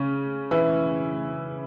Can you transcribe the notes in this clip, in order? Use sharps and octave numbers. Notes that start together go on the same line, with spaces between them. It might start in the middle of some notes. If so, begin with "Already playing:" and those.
Already playing: C#3 C#4
E3 E4